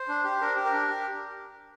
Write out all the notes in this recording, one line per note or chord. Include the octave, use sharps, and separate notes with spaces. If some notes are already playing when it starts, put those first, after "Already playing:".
Already playing: C5
D4
G4
D4 A#4
G4
A#4
D4
G4